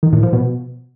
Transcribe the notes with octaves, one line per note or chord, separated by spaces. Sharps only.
D#3
A2
F3
B2